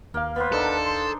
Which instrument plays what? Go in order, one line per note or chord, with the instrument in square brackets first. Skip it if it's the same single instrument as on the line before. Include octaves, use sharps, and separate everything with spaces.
[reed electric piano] D#2 F5 [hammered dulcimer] A#3
[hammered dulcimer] B3 C5 [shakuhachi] B4
[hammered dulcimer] D4 D#4 A#4 [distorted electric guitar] A4
[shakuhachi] C6